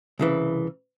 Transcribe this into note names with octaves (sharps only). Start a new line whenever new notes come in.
C2 C#3 E3